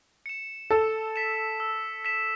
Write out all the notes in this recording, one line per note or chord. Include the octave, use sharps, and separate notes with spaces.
C#7 E7
A4 E6
B6 E7
E6
B6 E7